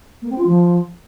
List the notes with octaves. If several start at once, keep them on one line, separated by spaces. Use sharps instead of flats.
A#3
C4
F4
F3